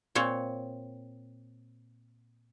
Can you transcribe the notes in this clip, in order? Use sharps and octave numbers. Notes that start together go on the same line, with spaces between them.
A#2 C4 C#5